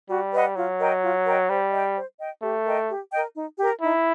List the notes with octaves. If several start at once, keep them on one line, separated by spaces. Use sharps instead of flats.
G3 F#4
B4 D#5 F#5
F#3 F4
A#4 D#5 G5
F4
A#4 D#5 G5
G3 C5
D#5 G5
C5
D#5 G5
A3 G4
A#4 D#5 G5
G4
A#4 D#5 G5
D#4
G4 A#4
D#4 E4